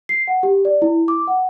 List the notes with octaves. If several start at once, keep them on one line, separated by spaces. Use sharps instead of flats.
C7
F#5
G4
D5
E4
D6
F#5